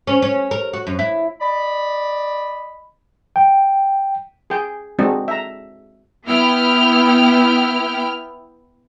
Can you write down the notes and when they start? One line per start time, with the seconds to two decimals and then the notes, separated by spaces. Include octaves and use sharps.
0.07 C#4
0.22 C#4
0.51 A#4
0.73 F#4
0.87 F#2
0.99 E4
1.41 D5 D#5 B5
3.36 G5
4.50 G#4 G5
4.99 G#3 C4 D4 D#4 F#4
5.28 E5 A#5
6.26 B3 E4 G5 F6